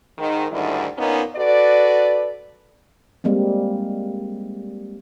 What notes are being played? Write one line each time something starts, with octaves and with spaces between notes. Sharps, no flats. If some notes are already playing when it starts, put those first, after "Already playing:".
G#2 D#3
D2 G#2 D3 D#3 G3 E4
A#2 A#3 B3 C#4 D#4
F#4 A4 B4 D5
G3 G#3 A#3 C4